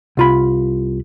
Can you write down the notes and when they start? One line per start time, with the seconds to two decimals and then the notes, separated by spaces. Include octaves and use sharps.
0.17 C2 F4 B5